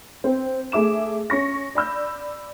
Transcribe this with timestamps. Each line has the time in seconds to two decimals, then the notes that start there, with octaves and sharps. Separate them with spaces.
0.24 C4
0.72 A3 G#4 E5 D6 E7
1.30 C#4 C#6 A#6
1.75 D5 B5 E6 G6